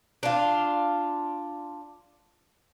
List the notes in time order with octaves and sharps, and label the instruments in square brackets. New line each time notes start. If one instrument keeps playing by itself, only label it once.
[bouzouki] D4 F4